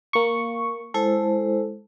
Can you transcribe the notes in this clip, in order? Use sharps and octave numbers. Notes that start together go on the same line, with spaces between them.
A#3 C#6
G#3 E4 A4 C5